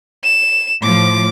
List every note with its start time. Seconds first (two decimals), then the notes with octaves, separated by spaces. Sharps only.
0.24 E7
0.83 A2 F3 D6